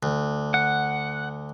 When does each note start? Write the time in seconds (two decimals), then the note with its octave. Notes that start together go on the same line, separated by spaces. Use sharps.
0.03 D2
0.54 F#5